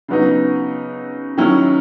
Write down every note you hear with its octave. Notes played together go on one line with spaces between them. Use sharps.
C#3 F#3 B3 D#4
D#3 F#3 C#4 E4